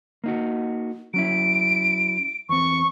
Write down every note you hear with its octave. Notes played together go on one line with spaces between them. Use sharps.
A#3 D#4 F#4
F#3 C#4 E4 D7
E2 C4 C#6